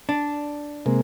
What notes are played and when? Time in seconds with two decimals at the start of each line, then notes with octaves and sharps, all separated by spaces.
0.09 D4
0.86 C3 G#3 A#3